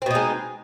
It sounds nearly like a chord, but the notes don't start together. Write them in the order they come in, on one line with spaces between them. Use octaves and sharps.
C4 B2 D#4 G#3